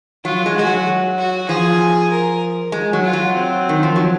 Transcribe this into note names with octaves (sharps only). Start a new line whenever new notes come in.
F#3 F4
G#3
G#3 F#4
F#3
F#4
F3 G#4
A#4
G#3
F#3
F4
F#3
C4
D#3
F3
F#3